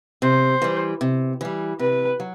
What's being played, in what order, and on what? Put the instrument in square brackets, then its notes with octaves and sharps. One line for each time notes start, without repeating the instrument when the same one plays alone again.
[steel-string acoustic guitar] C3 [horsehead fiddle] C5
[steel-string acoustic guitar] E3 G3
C3
E3 G3
[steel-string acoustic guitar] C3 [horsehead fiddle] B4
[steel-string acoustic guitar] F#3